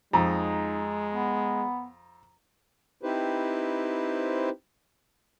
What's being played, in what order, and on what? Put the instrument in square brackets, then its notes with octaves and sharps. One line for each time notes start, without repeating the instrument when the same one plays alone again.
[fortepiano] F2 [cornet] G#3 [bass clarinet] D#4 [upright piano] A#5
[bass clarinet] B3
[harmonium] C4 D#4 E4 G4 B4 C5